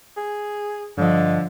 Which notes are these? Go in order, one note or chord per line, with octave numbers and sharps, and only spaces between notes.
G#4
G2 D3 F3 D#5